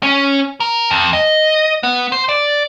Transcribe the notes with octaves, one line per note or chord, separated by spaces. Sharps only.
C#4
A#4
F2
D#5
B3
C5
D5